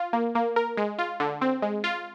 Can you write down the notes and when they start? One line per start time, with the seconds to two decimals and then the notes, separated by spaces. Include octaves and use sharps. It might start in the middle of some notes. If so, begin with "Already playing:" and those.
Already playing: F4
0.13 A#3
0.35 A#3
0.56 A#4
0.77 G#3
0.99 F4
1.20 D3
1.41 C4
1.62 G#3
1.84 F4